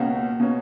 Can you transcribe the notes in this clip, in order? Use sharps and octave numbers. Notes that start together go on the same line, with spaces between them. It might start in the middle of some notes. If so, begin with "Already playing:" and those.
Already playing: C#2 B2 A#3 C#4 F#4
B2 A#3 C#4